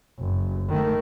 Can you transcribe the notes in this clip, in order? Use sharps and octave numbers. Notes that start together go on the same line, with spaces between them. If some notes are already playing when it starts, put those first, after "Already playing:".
F#1
D#3 A3